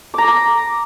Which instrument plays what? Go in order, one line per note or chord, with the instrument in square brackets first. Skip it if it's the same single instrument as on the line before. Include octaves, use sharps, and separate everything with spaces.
[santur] A#5 D6